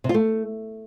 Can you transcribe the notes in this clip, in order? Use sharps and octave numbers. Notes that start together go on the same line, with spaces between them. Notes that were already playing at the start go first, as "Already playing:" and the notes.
C3
F4
A3